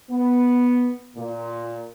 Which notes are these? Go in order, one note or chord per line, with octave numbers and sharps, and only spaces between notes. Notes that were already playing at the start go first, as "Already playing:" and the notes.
B3
A#2